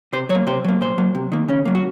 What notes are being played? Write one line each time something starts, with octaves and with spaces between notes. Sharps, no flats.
C3 C5
F#3 C#5
A#3
C3 C5
F#3 A#3
A#2 C5
F#3 A#3
C3
D#3 A#3
C#3 C#4
F#3 A#3
F#4